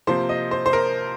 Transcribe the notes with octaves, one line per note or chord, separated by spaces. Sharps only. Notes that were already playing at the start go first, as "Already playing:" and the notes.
C3 F3 A#3 C5
D#5
C5
C5
A#4